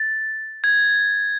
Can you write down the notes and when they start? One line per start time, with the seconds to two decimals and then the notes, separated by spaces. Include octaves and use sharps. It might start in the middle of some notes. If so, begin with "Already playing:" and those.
Already playing: A6
0.64 G#6